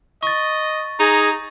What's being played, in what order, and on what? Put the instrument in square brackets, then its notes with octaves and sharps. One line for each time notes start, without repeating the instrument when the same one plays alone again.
[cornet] D#5 [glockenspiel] C#6 A6
[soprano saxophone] D#4 [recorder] G#4 [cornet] A#5